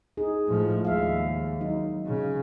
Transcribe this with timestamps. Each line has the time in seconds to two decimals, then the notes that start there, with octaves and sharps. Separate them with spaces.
0.17 D#4 G#4
0.48 A2 F3 G#3
0.85 D#2 G#3 E5 F5
1.60 F#3 D#4
2.06 C#3